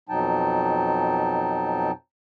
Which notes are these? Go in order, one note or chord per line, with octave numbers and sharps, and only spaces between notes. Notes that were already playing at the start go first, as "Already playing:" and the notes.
F2 B2 F#3 D#4 G5 A5